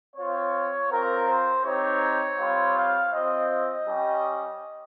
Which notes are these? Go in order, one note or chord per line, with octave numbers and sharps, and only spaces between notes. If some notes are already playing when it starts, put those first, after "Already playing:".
C4 F4 C#5
C4 F4 A#4
C5
C4 D#4 G4 C#5
G3 C4 F4
F5
C4 F4 D#5
D#5
G3 C#4 G4